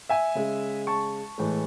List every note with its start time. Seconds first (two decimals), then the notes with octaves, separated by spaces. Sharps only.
0.09 E5 G#5
0.35 C#3 G#3
0.87 A5 C#6
1.38 A2 E3 G#3